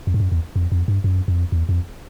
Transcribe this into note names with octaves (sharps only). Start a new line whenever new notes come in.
F2
G2
F#2
E2
F2
F2
G2
F#2
F2
E2
F2